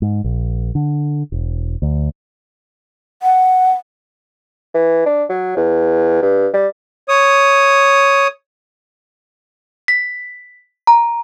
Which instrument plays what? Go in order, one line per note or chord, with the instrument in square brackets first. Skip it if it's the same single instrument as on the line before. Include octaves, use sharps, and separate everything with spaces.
[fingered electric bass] G#2
A#1
D3
E1
D2
[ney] F#5
[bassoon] E3
D4
F#3
E2
G2
G3
[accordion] C#5 D#6
[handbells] B6
A#5